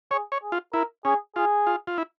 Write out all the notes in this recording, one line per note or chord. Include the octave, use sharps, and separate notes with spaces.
G#4 C#5
C#5
G#4
F4
E4 A#4
C#4 G#4
F4 G#4
F4
F4
E4